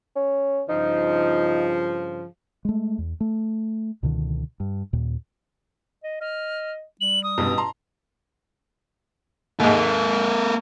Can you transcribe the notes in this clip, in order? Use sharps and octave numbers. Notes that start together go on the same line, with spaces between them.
C#4
G2 C#3 F3 D#4
G#3 A3
E2
A3
C#2 B2 D3 D#3
G2
D#2 A#2
D#5
D#5 F6
G3 F#7
D#6
A1 G2 B2
A5 A#5 C6
D#2 G#2 A#3 A4